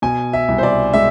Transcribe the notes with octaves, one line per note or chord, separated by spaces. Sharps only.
B2 G#5
E5
C2
C5
D5
G#3 E5